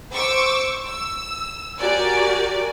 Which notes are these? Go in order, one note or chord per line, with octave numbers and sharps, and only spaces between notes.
C5 C#6 D6 E6
E6
F#4 G4 A#4 D5 G#5